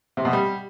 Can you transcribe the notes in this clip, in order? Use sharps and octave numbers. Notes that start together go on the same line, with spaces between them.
C3
B2
G3